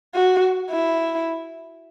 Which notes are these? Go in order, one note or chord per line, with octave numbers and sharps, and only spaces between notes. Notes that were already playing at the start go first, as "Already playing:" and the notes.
F#4
E4